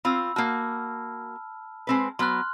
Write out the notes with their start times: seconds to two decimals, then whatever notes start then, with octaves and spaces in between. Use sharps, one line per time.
0.05 C4 F4 B5 E6
0.36 A#3 F#4 A5 F6
1.87 G#3 C4 B4
2.19 F#3 B3 C6 F6 F#6